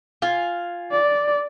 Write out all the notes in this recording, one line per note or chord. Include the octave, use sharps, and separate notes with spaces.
F4 F5 G#5
D5